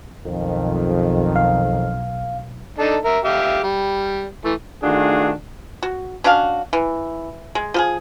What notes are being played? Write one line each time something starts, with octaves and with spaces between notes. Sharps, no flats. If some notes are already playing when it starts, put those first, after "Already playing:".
B1 F2 D#3
F5
D4 D#4 A4
A#4 E5
G4 E5 F5
G3
E3 A3
D#3 A3 D4 F4 F#4 G#4
F#4
C#4 D4 F#4 F5
E3
G#3
F3 G4 G#4